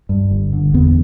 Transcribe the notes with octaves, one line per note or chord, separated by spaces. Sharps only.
G2
G1
D3
E2 B3